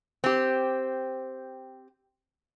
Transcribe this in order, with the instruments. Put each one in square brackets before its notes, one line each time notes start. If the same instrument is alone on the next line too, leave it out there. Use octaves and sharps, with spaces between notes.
[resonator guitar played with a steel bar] C4 G4